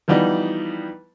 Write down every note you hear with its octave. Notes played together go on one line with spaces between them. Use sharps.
E3 F3 G3 B3 D#4